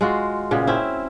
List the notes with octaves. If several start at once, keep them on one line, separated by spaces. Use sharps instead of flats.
G#3 F4 F#4
A#2 C#3 B3
C4 C#4 E4